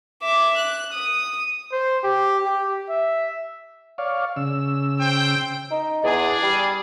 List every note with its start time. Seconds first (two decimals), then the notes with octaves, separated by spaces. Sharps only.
0.22 E5 D6
0.58 F#6
0.93 D#6
1.72 C5
2.04 G4
2.46 G4
2.90 E5
3.98 C#5 D5 F5
4.36 C#3 E6
5.00 C5 G5
5.71 D#4
6.04 E2 D4 G#4
6.43 G3